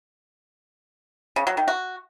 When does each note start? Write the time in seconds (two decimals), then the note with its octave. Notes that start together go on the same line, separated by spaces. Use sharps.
1.36 C#3
1.47 F#3
1.57 D#3
1.68 F#4